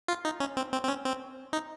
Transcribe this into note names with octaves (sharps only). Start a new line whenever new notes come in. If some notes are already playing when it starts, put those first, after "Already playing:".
F4
D#4
C#4
C4
C4
C4
C#4
C4
D#4